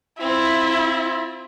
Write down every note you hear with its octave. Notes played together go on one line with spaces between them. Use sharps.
C4 E4 F4